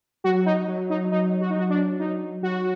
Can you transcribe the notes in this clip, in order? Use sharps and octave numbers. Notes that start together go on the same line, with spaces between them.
F#3 F#4
D#4
F#3
D#4
F#3 D#4
F#4
D#4
F#3 F#4
D4
F#3 D#4
F#3 F#4